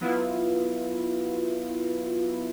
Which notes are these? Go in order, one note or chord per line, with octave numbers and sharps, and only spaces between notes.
F#3 B3 E4 F4